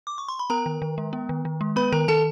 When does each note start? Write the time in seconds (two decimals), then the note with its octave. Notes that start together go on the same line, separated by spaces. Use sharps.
0.07 D6
0.18 C#6
0.28 C6
0.39 B5
0.50 B3 A#4 A#5
0.66 D#3
0.82 D#3
0.98 G#3
1.13 B3
1.29 D#3
1.45 D#3
1.61 G#3
1.76 B3 B4 B5
1.92 D#3 A#4 A#5
2.08 D#3 A4 A5